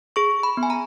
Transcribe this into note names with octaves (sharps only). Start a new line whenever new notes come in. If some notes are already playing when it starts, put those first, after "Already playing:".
G#4 C#6
B5
B3
G#5
A#5